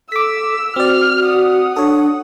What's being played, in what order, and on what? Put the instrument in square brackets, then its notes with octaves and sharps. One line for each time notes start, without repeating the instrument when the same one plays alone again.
[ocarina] A4 [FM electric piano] D6 B6 [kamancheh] E6
[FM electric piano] C4 D5 [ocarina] F#4 [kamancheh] F6
[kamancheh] F#5 D#6
[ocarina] D4 [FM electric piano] A4 C#5